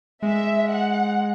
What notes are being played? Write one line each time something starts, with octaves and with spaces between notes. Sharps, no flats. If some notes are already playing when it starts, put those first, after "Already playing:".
G#3 E5
F#5